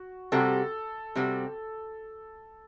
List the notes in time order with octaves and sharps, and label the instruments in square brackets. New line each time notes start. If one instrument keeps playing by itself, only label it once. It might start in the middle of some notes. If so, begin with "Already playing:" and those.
Already playing: [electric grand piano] F#4
[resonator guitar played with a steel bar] C3 G3 C4 F#4 [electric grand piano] A4
[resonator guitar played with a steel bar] C3 G3 C4 F#4